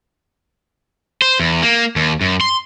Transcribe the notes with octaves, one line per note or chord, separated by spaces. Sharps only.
C5
E2
A#3
D#2
F#2
C6